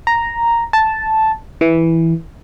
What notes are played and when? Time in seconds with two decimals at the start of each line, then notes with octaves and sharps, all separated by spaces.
0.07 A#5
0.73 A5
1.61 E3